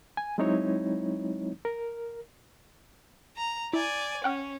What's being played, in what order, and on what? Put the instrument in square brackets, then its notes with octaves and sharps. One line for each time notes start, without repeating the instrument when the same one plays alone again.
[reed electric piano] G#5
F#3 G#3 C4 D#4 E4 C#5
A#4
[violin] A#5
[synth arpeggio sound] E4 [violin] D5 G#5
[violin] C#4 [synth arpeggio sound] F#5 G5 F6